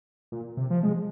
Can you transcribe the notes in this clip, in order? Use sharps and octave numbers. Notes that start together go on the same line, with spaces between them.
A#2
C3
F3
G#3